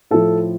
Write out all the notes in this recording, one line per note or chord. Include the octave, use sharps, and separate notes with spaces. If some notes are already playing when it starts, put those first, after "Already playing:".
A2 F3 A4